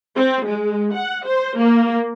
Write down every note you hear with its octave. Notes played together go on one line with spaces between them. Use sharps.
C4
G#3
F#5
C5
A#3